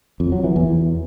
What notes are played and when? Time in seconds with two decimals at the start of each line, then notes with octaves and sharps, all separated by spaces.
0.20 F2
0.32 F#3
0.44 E3
0.56 E2